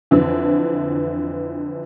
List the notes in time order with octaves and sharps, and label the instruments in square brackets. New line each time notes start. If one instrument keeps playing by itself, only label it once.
[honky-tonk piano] F2 D3 E3